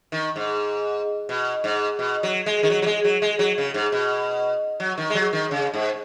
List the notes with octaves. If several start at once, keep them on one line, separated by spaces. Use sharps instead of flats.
D#3
G#2
B2
G#2
B2
F#3
G#3
D#3
F#3
F#3
G#3
F#3
G#3
F#3
C#3
G#2
B2
F#3
D#3
G#3
F#3
D#3
C#3
G#2